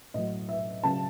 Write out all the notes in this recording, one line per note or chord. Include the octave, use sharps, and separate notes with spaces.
A2 F#3 D#5
E5
C#3 F#3 A5